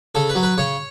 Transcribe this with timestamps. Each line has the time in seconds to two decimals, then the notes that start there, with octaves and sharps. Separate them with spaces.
0.15 C#3 A4
0.29 B4
0.35 F#3
0.43 B4
0.58 C#3 C#5